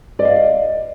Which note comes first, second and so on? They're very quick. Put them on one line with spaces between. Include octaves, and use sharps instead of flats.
D5 D#5 F5